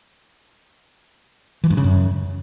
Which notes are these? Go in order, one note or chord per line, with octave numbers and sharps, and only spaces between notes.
E3
G2
C#3
F#2